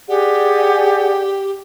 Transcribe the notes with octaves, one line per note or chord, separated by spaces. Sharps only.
G4 G#4 D5 F#5